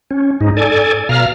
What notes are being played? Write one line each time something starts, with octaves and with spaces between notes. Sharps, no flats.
C#4
G#2 D#4
A4 D5 G#5
B2 F5 A#5 F6